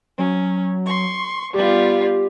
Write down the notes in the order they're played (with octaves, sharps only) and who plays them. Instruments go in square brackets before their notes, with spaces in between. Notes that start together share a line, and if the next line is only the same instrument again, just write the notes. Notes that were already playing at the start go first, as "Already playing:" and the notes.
[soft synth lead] F#3 [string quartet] C#4
[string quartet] C6 C#6
[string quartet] G3 B3 F4 [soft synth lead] G4